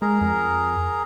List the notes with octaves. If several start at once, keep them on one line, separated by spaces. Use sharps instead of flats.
G#3 G#4 A#4 A#5
F2